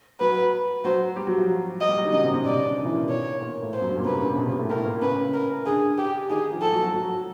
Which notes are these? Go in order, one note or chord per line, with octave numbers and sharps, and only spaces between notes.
F#3 F#4 B4
F#3 F#4 C5
G3 G4
F#3 F#4
F3 F4
D#5
G3 G4
F#3 F#4
D#3 D#4
C#3 C#4 D#5
C3 C4
C3 C4
B2 B3 D5
C#3 C#4
D3 D4
D#3 D#4
E3 E4
A#2 A#3
B2 B3
C#5
A#2 A#3
A2 A3
C5
F#2 F#3
G2 G3
A#2 A#3
C3 C4 B4
C#3 C#4
C3 C4
B2 B3
A#2 A#3
A2 A3
A2 A3 A#4
A#2 A#3
C#3 C#4 B4
A#4
D3 D4 G#4
G4
D#3 D#4 G#4
F3 F4
F3 F4 A4
F#3 F#4
F#3 F#4
F#3 F#4